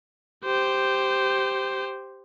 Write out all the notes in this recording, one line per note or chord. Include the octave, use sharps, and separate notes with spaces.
G4 C5